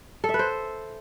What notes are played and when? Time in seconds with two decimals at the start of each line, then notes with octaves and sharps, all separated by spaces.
0.24 A4
0.29 E5
0.34 B4
0.39 C5